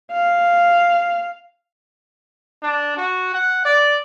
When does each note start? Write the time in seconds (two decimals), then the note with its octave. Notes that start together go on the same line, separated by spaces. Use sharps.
0.12 F5
2.63 D4
2.97 F#4
3.34 F#5
3.65 D5